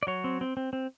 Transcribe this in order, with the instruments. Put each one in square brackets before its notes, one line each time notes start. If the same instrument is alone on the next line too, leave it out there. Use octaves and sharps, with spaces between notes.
[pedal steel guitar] D5
F#3 C#5
C4
C4
C4
C4